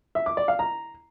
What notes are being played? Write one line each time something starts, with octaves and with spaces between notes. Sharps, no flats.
E5
D6
D5
F5
A#5